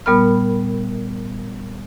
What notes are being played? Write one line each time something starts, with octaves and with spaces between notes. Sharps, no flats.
A#2 G3 B3 A#4 B5 F6